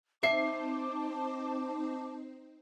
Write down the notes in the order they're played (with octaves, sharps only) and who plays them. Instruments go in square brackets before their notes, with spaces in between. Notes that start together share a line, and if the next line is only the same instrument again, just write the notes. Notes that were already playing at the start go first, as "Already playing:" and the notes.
[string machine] C4 D#4 C5 [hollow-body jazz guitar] E5 [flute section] A5 D6 [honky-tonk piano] C7